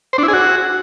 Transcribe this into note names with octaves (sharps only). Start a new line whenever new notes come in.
C5
D4
E4
G#4
F#4